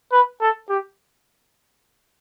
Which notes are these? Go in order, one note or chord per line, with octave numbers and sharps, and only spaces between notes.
B4
A4
G4